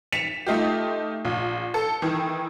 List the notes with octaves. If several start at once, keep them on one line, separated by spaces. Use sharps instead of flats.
A6 B6 C#7 E7 F7
A3 D#4 F4 G4
A#1
A4
D#3 E3